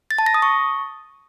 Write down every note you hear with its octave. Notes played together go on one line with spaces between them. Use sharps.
A6
A5
A#6
D#6
C#6